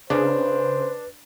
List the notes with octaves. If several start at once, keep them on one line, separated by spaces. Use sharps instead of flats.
C#3 D4 B4 C5